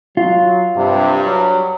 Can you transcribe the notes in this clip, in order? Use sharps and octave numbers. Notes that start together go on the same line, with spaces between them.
F#3 F4
G2 C3
F#3